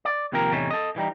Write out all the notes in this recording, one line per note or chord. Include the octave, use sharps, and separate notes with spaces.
D5
D#2 C3 F3 A#3 C4 A#4
E2 A2 C3 E3 C#4 D#4
A4 D#5
E3 G3 D#4